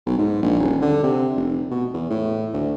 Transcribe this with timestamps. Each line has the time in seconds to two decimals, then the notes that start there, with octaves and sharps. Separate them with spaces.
0.06 B1
0.19 G#2
0.43 A#1
0.60 D#1
0.82 D3
1.03 C3
1.36 F1
1.71 B2
1.94 E2
2.10 A2
2.54 D2